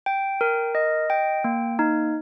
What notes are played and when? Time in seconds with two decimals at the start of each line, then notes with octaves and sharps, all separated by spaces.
0.06 G5
0.41 A#4
0.75 D#5
1.10 G5
1.44 A#3
1.79 D#4